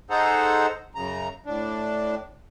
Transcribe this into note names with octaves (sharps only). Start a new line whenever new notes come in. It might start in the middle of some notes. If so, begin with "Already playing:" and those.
D#4 G#4 A4 C5 F#5 A#5
F#2 C#3 A#5
A2 D4